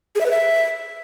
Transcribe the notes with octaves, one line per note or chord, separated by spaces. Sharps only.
G#4
E5
B4
E5